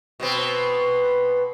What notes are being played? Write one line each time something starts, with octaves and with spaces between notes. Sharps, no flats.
B2 B3 C4